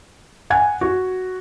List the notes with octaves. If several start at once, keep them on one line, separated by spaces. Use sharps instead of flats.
F#5 G#5 G#6
F#4